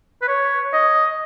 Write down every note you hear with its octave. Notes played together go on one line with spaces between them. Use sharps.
B4
C#5
D#5